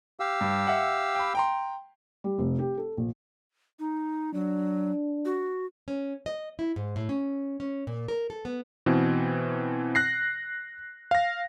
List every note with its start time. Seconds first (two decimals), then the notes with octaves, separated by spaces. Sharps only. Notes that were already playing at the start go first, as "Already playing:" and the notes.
0.20 G4 F5 E6
0.41 G2
0.67 E5 F#5
1.15 G5 B5
1.35 G5 A#5 C6
2.24 G3
2.38 F1
2.59 G4
2.77 A4
2.97 A#1
3.79 D#4
4.34 F#3 D4
5.25 F#4
5.88 C#4
6.26 D#5
6.59 E4
6.76 G#2
6.96 A2
7.09 C#4
7.60 C#4
7.87 A#2
8.08 A#4
8.30 A4
8.45 B3
8.86 B2 E3 C4
9.95 F#6 A#6 C7
11.11 F5 A#6